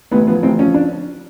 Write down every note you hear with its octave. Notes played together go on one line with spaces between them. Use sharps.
A1 B3
F3 B3
A1 C4
F3 C#4
D4